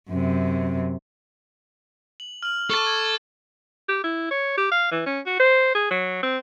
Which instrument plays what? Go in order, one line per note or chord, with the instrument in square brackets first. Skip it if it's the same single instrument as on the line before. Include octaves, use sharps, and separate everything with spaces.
[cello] F#2 C3
[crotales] F#7
F6 F#7
[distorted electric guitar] A4 A5 [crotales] C#6 D6
[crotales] G#6 F#7
[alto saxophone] G4
E4
C#5
G4
F5
E3
C#4
F#4
C5
G#4
F#3
C4